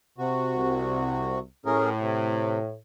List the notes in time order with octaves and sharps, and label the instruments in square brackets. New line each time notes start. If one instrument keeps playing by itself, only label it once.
[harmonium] C3 F#4
[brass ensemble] C2
[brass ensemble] A2 [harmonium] C#4 G#4 A#4
[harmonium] C3